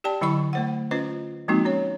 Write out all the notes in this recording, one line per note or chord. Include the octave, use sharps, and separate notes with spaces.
G4 D5 G5 A5
D3 F#3 E4 D#5 B5 C#6
A3 C5 F#5
C#4 F4 B4 C5 D#5
F3 G#3 A#3 C4 D#4 F#4
C#4 C#5